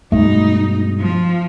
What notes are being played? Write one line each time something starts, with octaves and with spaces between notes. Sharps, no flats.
G2 B2 G#3 A3 D#4
F3